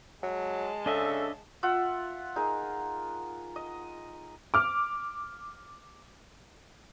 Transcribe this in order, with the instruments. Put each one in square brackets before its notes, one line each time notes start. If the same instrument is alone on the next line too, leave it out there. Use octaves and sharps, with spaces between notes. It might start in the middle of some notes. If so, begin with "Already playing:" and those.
[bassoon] F#3 [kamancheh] G#3 A5
[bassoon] C#3 [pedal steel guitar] D4 D#5 E5 [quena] A4
[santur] F4 E5 F#5
D#4 G#4 A#4
D#5
[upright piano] D6 F6